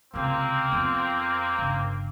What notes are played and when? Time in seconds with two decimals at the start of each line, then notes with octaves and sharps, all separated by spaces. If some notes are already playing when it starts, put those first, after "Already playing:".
0.14 C#2 C3 A#3 C4
0.72 F2 B3
1.58 G1 C#3